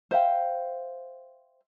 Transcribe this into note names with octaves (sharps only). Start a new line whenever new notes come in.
C5 E5 F5 G5